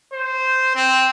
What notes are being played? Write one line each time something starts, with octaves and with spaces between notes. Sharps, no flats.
C5
C4